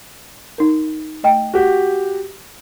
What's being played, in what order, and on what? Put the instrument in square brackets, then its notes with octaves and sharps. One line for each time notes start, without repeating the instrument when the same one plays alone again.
[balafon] D#4 A#4
A3 D#5 G5
[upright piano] F#4 G4